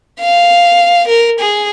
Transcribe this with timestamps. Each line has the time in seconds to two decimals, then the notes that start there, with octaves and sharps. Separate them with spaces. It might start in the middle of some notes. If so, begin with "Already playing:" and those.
0.20 F5
1.08 A#4
1.39 G#4